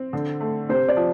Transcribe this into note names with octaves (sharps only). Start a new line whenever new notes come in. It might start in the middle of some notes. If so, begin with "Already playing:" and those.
Already playing: C4
D3
A3
C3 C5
D5
F3